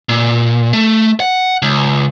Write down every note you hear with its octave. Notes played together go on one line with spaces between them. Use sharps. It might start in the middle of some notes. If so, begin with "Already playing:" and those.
A#2
A3
F#5
C#2